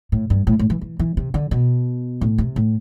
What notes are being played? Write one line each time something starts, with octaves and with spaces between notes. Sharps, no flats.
A2
G2
A2
A2
E3
E3
E3
C3
D3
B2
A2
C3
A2